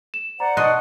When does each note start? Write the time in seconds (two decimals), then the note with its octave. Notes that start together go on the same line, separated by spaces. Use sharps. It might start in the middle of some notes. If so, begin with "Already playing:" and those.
0.14 E7
0.40 C5 D5 F#5 A#5
0.57 B2 D#5 A5 C6 D#6 F#6